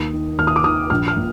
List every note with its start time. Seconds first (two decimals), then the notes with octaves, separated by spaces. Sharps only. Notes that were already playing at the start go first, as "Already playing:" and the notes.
Already playing: D#2 D#6
0.13 D#3
0.38 D#2 F6
0.47 D#6
0.56 D6
0.64 D#3 D#6
0.90 A#1 F6
1.08 F6
1.17 A#2